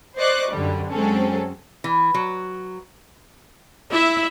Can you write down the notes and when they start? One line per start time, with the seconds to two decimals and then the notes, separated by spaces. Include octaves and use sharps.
0.17 C5 D5 D#5 C#6 D6 F#6
0.51 F#2 D3 G3
0.90 F#3 G#3 C4 C#4 A4
1.84 E3
2.14 F#3
3.91 E4 E5